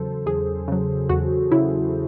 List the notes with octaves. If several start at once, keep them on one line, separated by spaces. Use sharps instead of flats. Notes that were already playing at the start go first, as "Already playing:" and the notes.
Already playing: E2 C#3 F#3 A4 C5
E2 G#4
C#3 F#3
E2 F#4
C#3 F#3 E4